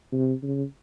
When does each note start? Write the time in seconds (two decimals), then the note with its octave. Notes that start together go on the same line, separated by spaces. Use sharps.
0.12 C3
0.43 C#3